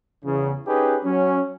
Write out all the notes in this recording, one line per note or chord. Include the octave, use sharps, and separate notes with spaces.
E2 C#3
C#4 D#4 G4 G#4 B4
F#3 C#4